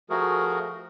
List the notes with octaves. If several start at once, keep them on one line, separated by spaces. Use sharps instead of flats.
F3 A3 F#4 G#4 A#4